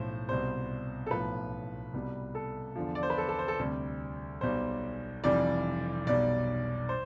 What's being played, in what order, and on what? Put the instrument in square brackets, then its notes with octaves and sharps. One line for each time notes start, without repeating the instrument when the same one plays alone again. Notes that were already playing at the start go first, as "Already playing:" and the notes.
Already playing: [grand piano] B1 A2 F3 C5
C2 B2 G3 C5
A4
B1 A2 F3 B4
C2 B2 G3
A4
E2 D3 F3
D5
C5
B4
A4
A4
C5
A4
D2 C3 G3
B1 B2 G3 C5
F1 F2 E3 G3 D5
B1 B2 G3 D5
C5